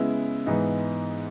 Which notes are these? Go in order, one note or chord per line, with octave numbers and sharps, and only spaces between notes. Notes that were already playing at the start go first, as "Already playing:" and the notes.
Already playing: C#3 G#3 B3 E4
G#2 E3 B3 D#4